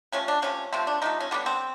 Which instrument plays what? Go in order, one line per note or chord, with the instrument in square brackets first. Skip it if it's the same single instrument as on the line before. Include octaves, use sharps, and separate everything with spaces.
[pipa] C3 F3 A3 C#4
D4
C3 F3 A3 C#4
C3 F3 A3 C4
D4
C3 F3 A3 D#4
C#4
D3 G3 B3 D4
C4